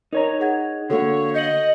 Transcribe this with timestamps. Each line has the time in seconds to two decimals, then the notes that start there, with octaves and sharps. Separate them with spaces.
0.13 D#4 A#4 C#5 A#5
0.40 G#4 F#5 G#6
0.90 D3 A#3 F#4 A4 C#5 F#5
1.34 D#5 G6 C#7 F#7